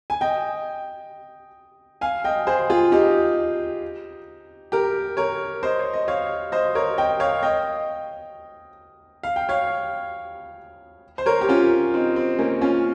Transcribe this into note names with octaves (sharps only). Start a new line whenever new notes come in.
G#5
D#5 G5
F5 G#5
D#5 G5
G#4 C5
F4 G#4
D#4 G4
G4 A#4
A#4 C#5
C5 D#5
C#5
D#5
C#5 F5
C5 D#5
A#4 C#5
D#5 G5
C#5 F5
D#5 G5
F5
G5
C#5 F5
C5
A#4 C#5
G4
C#4 F4
C4 D#4
C4
A#3 C#4
C#4 F4